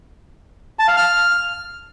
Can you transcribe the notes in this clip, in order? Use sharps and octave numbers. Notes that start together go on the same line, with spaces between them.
A5
F5
F6